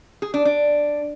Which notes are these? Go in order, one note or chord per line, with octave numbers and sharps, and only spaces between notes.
G#4
D4
D4